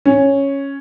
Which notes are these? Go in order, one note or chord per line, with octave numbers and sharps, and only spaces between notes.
C#4